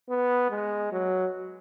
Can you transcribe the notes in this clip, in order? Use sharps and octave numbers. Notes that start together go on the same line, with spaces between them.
B3
G#3
F#3